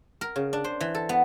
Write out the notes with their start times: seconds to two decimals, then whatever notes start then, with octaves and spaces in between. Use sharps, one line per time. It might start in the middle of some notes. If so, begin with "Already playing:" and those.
0.21 A#4
0.36 C#3
0.53 D4
0.64 C5
0.81 E3
0.95 A4
1.09 B3